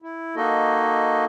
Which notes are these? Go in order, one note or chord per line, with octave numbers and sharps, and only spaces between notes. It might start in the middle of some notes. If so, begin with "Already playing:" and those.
E4
A#3 D#4 F#4 A4 D#5